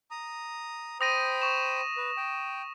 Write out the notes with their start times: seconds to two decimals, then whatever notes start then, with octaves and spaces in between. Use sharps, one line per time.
0.11 A#5 D#6
1.01 C5 G5 B5 D#6 A#6 D#7
1.42 C#6 E7
1.97 B4
2.17 G5